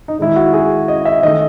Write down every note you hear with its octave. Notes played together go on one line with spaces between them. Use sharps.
D#4
D#3 G#3 D#4 E4
F#4
G#4
D#5
E5
D#3 A3 D#4 D#5